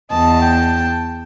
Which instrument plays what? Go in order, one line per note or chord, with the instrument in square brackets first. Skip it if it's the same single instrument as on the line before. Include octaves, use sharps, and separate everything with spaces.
[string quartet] E2 A5 [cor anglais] D#5
[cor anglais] G5